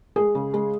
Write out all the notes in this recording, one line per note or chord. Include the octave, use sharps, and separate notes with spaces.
G#3 G#4
C#3
G#3